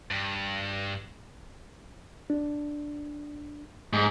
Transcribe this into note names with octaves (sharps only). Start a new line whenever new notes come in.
G2
D4
G#2